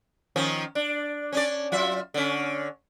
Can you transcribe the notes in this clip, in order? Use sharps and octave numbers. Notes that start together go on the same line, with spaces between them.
D#3 F3 C#4
D4
C#4 D4 D5
F#3 F4 E5
D3 C#4